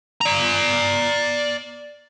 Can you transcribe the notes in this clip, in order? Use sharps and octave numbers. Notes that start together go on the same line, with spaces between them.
D5 A#5